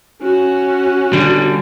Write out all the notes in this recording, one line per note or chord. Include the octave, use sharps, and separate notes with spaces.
C#4 F#4
D3 G3